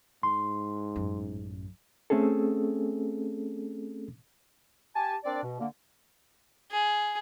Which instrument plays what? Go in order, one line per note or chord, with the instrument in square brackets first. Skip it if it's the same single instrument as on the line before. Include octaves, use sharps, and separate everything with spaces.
[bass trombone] G#2 [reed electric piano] C6
[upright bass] A1 F#2
[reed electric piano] A3 C4 C#4 G#4 A4
[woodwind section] G4 G#5 A5
C4 D4 A#4 D5
B2
D3 A#3
[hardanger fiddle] G#4